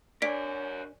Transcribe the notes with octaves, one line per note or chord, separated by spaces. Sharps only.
D4 A#4 C#5 D5 G#5 B6 D7